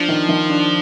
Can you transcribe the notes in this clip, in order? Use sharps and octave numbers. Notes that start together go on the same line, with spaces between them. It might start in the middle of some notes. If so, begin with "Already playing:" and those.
Already playing: F3 D4
D#3
D#3
D4